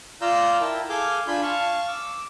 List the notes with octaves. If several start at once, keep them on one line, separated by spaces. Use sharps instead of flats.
F4 D5 F5 A#5 E6 G6
E4 A#4 G5 A5
G#4 A4 F5 G#5 D6 G6
D4 F4 G#5 B5 C6 G6
F5 A5 C#6
D6 E6